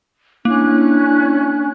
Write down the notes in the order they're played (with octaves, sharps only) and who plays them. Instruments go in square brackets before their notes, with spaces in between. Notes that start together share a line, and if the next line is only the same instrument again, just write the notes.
[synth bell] A#3 [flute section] C#4 F#6 [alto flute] D4 [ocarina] E4